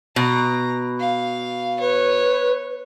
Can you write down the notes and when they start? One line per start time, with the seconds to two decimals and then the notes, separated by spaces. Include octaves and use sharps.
0.16 B2 A#5
1.00 F5
1.80 B4 C#5